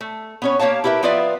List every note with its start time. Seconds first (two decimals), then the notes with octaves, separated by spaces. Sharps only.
0.01 A3
0.42 B3 C#4 C#5
0.59 A#3 G4 C#5 F5 A5
0.84 E4 G4 A#4 B4 E5
1.03 F3 B3 F4 B4 D5 E5